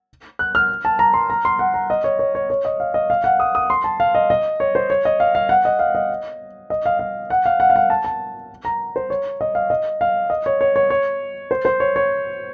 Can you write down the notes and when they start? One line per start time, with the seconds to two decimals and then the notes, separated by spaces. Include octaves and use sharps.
0.39 F#6
0.55 F6
0.85 A5
0.99 A#5
1.14 C6
1.30 A#5
1.45 C6
1.59 F#5
1.74 A#5
1.90 D#5
2.04 C#5
2.19 C#5
2.35 C#5
2.50 C#5
2.65 D#5
2.80 F5
2.94 D#5
3.10 F5
3.24 F#5
3.40 D#6
3.55 D#6
3.70 C6
3.84 A5
4.00 F5
4.15 D#5
4.30 D#5
4.60 C#5
4.75 C5
4.90 C#5
5.05 D#5
5.20 F5
5.35 F5
5.49 F#5
5.65 D#5
5.79 F5
5.95 D#5
6.70 D#5
6.86 F5
6.99 F5
7.30 F#5
7.46 F5
7.60 F#5
7.70 F5
7.76 F#5
7.90 A5
8.05 A5
8.65 A#5
8.96 C5
9.10 C#5
9.41 D#5
9.55 F5
9.70 D#5
10.01 F5
10.30 D#5
10.46 C#5
10.61 C#5
10.76 C#5
10.90 C#5
11.51 C5
11.65 C5
11.80 C#5
11.96 C#5